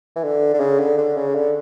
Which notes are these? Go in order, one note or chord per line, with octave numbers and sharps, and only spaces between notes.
E3
D3
D3
C#3
D3
D3
C#3
D3